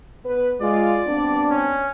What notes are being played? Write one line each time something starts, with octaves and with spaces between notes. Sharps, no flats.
B3 B4
G#3 F4 D5
G2 B3 C4 D4
C#4